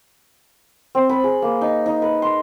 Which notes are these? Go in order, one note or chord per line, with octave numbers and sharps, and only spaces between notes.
C4
B5
G#4
A#3
D#4
D#4
B4
C6